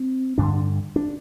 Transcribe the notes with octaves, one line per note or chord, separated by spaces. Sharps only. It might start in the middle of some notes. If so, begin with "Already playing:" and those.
Already playing: C4
G2 D3 D4
D4